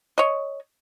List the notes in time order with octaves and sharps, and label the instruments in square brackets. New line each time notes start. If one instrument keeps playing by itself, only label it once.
[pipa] C#5 D#5